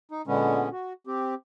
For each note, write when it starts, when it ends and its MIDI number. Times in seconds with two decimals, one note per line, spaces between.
0.11 0.22 63
0.27 0.69 46
0.27 0.69 50
0.27 0.69 56
0.27 0.69 59
0.27 0.69 61
0.72 0.93 66
1.07 1.35 60
1.07 1.35 67